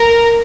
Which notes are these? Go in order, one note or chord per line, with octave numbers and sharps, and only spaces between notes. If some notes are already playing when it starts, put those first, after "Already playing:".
Already playing: A#4